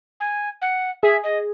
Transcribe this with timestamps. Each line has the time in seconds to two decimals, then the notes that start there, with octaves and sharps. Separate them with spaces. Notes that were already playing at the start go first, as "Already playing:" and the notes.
0.20 G#5
0.62 F#5
1.03 G#4 E5
1.24 D#5